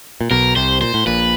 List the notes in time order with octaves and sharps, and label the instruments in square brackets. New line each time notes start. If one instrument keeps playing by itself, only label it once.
[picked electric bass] A#2
[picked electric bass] B1 B2 [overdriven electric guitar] A#4
[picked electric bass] C2 C3 [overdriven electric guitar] C5
[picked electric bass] A#2 [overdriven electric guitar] C5
[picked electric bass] A2
[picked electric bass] A#1 A#2 [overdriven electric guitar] B4